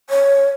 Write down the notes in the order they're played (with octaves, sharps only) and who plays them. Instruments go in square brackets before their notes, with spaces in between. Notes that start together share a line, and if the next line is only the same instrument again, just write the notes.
[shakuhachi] C#5